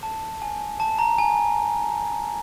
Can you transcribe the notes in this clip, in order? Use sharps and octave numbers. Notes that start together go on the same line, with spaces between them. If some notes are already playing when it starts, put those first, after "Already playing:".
A5
G#5
A5
A#5
G#5